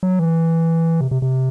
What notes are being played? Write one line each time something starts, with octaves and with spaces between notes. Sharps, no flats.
F#3
E3
C3
C3
C3